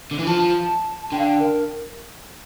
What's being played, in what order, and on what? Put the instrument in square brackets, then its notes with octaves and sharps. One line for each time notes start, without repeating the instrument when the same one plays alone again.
[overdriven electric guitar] D3
E3
[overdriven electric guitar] F3 [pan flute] A5
[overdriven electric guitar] D3 [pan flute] G5
[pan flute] F5
G5
A#4